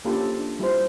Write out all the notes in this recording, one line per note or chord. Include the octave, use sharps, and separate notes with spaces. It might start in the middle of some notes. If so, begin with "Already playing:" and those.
A#3 C#4 D4 F4 G4 A4
D4
G3 E4 F4 C5